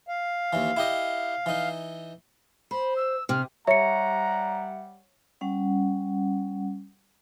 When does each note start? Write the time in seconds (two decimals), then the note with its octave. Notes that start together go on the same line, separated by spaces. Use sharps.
0.08 F5
0.53 D#2 E3
0.77 E4 G4 D#5
1.46 E3 D#4
2.71 C5 B5
2.96 E6
3.29 C3 F6
3.67 G3 C#5 E5 F#5 A#5 C#7
5.41 G3 C#4 F#5